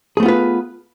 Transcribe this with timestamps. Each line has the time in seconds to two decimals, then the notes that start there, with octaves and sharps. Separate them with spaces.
0.17 G#4
0.20 A3
0.23 B3
0.25 F4
0.28 B4